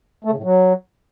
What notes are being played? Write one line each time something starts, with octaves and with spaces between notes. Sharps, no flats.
A3
C#3
A2
F#3